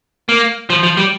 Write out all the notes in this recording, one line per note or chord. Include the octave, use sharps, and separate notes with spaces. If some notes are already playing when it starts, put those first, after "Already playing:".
A#3
F3
F3
G3